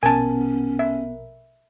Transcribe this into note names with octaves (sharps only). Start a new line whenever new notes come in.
A#1 B2 B3 C#4 A#4 G#5 A5
E5